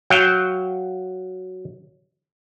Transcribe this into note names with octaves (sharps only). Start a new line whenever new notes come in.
F#3 F5 G5